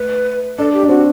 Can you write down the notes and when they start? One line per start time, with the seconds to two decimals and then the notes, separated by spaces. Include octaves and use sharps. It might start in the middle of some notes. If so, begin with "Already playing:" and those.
Already playing: A3 B4
0.58 D4 A4
0.73 G4
0.83 D4
0.89 C4 F#4